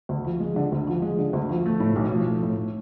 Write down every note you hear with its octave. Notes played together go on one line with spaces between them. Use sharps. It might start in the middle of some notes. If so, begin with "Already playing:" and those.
D2
F3
G#3
D3
D2
F3
G#3
D3
D2
F3
A3
A2
B1
F3
A3
A2